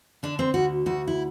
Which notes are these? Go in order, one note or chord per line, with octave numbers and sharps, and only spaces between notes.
D3 D4
C4
D2 F#4
D2 F#4
E4